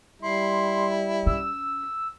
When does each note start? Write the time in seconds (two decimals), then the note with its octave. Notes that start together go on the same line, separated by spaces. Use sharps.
0.22 G3 E4 C6
1.26 C#4 E6